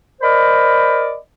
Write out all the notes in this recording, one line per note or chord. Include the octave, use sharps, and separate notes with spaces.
A#4 C5 D5 D#5 B5